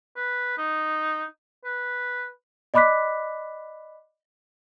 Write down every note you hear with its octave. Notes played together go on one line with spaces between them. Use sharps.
B4
D#4
B4
D5 D#5 B5 D6 F#6 B6